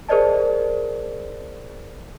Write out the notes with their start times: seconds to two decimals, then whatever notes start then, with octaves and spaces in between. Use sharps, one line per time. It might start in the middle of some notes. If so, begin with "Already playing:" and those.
0.09 G#4 A#4 C5 D5 D#5 A5